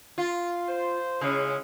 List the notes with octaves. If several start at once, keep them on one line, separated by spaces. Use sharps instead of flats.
F4
C5
C#3 G#3 C#4 E4